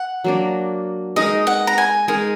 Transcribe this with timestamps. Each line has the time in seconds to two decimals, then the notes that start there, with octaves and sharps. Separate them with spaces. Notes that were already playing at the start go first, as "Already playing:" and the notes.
Already playing: F#5
0.24 F#3 A#3 D4
1.16 G#3 D#4 A#4 D#5
1.47 F#5
1.67 A#5
1.78 G#5
2.08 G#3 D#4 A#4 G#5